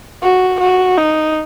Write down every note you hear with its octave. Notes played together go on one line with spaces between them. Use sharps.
F#4
F#4
D#4